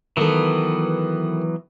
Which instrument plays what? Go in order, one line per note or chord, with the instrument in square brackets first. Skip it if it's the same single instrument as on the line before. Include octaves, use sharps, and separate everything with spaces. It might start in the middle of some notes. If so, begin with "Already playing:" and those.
[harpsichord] D#3 A3 [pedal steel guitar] E3 F#3 B3